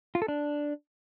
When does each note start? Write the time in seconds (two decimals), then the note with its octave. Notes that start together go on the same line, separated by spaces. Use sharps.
0.15 F4
0.22 A4
0.28 D4